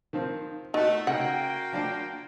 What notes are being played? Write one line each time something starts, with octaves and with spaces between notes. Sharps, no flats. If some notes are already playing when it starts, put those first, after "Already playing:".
D#3 F3 C4
A3 D#4 F#4 F#5 C#6
C#3 A#3 F#4 F#5 G5
F3 D4 D5